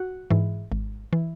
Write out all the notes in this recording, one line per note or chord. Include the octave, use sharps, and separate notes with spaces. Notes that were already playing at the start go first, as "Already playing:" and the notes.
Already playing: F#4
G#2 E3
G#1
E3